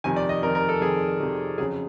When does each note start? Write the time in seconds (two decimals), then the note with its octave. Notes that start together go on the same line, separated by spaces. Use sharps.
0.04 F2 C3 D#3 G#5
0.16 D5
0.29 D#5
0.43 F2 C3 D#3 A#4
0.55 A#4
0.69 A4
0.81 F2 C3 D#3 G#4
1.19 F2 C3 D#3
1.58 F2 C#3 F#3 G#4